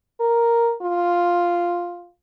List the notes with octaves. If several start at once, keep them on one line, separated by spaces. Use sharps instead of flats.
A#4
F4